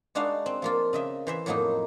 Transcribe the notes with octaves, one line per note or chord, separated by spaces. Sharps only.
G#3 D4 D#4 F#4 F5
C4
F3 A#3 F4
C#3 D#5 E5
E3 C5 E5
F2 A2 F#3 A#3 D#4